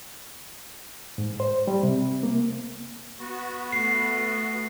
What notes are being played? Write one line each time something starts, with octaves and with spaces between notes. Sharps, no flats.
G#2
C5
G3
C3
A#3
B3 F#4
A3 C7